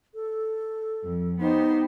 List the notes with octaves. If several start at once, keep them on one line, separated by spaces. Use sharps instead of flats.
A4
F2
B3 D#4 G4 C5